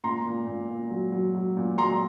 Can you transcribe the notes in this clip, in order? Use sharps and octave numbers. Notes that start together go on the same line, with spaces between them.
A#2 A#5 C6
A#2
A#2
A#2
F#3
F#3
F#3
A#2
F#3 A#5 C6